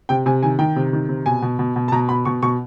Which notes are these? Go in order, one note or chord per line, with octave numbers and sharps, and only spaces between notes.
C3 G5
C3 G#5
D#3 G#5
D#3 G5
C3
D#3
C3
B2 G#5
B2
B2
B2
A5
B2 A#5
B2 B5
B2 C#6
B2 C#6